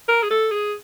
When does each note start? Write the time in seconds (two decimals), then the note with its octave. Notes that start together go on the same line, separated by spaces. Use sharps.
0.08 A#4
0.22 G#4
0.30 A4
0.51 G#4